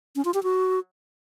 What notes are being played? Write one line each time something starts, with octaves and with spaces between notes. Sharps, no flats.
C#4
F4
G4
F#4